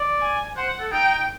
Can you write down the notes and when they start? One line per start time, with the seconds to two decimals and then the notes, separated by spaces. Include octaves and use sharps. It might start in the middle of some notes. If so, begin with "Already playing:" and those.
Already playing: D5
0.21 G#5
0.57 C5 F#5
0.80 A4
0.92 D#4 G5